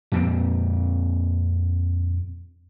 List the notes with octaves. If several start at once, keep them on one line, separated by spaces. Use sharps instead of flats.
F2 A#2 F3 C4